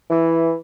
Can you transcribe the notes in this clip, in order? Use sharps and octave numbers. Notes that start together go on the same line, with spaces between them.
E3